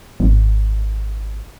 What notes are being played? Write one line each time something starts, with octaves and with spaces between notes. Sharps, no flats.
G#1